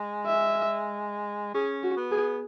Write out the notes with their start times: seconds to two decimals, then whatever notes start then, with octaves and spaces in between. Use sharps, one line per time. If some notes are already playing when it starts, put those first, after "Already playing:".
Already playing: G#3
0.27 E5
1.54 C#4 G#4
1.83 F#4
1.97 B3
2.11 G#4